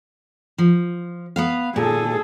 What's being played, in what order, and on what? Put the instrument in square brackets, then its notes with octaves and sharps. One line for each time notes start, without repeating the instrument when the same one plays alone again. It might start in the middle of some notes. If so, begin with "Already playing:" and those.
[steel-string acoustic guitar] F3
B3 B4 F5
[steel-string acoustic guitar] A#2 [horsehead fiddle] G#4 A4